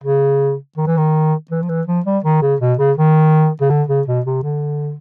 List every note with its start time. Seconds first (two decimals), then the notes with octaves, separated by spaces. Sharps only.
0.04 C#3
0.77 D#3
0.87 E3
0.97 D#3
1.51 E3
1.62 F3
1.69 E3
1.87 F3
2.05 G3
2.24 D#3
2.42 C#3
2.61 B2
2.79 C#3
2.97 D#3
3.61 C#3
3.70 D3
3.88 C#3
4.08 B2
4.26 C3
4.43 D3